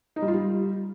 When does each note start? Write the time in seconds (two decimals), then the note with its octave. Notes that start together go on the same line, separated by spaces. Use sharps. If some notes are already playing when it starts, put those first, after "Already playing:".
0.16 D#4
0.22 G3
0.28 F4
0.34 G3